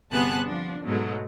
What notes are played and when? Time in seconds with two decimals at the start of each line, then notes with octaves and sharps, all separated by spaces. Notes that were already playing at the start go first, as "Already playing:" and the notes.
0.12 G1 C3 B3 G#4 A5 F#6
0.47 F3 D4
0.85 G#2 B2 F#3 G#3 A3